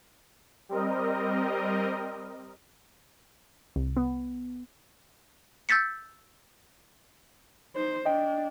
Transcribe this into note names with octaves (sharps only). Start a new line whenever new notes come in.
G3 C4 A#4 D#5
C2
B3
E6 G6 A6 B6 C#7
D#4 C5
D4 D#5 G5